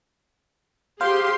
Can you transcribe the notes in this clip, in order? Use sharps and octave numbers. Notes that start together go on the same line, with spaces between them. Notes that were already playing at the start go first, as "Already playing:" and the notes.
G4 G#4 C5 F5 C6